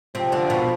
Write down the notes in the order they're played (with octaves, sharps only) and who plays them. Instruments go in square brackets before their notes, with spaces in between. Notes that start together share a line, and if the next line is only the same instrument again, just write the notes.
[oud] C3 C4 [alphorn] F3
[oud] D3 D4
B2 B3